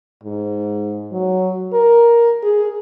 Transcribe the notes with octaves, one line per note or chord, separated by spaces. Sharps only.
G#2
F#3
A#4
G#4